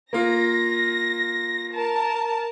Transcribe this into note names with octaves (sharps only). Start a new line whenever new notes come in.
A#3 F4 A#6
A#4 A5